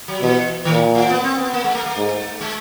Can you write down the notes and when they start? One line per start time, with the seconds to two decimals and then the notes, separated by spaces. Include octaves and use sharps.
0.08 F#3
0.22 B2 E3
0.65 A#2 D#3
0.95 F3
1.10 B3
1.24 C4
1.38 B3
1.53 A#3
1.64 G#3
1.75 A3
1.86 A3
1.97 G#2
2.41 G#3